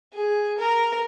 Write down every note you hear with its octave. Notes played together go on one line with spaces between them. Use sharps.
G#4
A#4